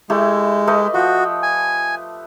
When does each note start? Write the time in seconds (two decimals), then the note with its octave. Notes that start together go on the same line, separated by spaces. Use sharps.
0.10 G#3 A3 E4 G4
0.67 A3 B4 D#5
0.94 F3 F#4 G5
1.43 G#5